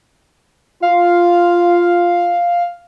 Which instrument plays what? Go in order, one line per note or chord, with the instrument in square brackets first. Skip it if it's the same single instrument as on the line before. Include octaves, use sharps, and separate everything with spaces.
[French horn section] F4 [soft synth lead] F5